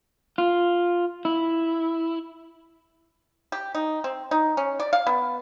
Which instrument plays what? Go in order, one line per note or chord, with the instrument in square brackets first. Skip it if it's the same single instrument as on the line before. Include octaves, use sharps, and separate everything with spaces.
[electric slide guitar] F4
E4
[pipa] G4
D#4
C4
D#4
C#4
D5
F5
B3